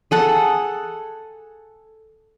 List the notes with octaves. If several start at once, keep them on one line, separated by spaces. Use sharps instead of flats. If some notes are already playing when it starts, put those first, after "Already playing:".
G#4 A4 F#5